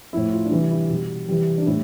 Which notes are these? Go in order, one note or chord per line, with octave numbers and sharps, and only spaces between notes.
A2 F3 E4
F4
D4
C3 E3 G3 E4
E4
B2 G3
C3 E3 G3
D4
A2 G3 E4